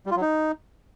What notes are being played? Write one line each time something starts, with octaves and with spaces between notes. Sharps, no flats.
G3
F4
F#3
D#4